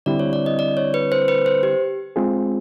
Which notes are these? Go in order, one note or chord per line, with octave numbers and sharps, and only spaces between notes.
D3 G3 C4 E4 D5
C#5
D5
D#5
D5
C#5
B4
C5
B4
C5
G4
G#3 C4 F4 G#4